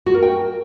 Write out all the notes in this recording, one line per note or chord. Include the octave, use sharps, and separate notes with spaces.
F#4
A#4
G5